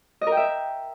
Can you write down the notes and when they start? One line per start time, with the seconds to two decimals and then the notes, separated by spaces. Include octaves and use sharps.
0.21 D#5
0.27 A#4
0.32 G5
0.37 E5